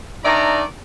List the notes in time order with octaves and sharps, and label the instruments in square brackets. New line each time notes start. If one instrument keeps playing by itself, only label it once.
[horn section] D#3 D4 D5 E5 A#5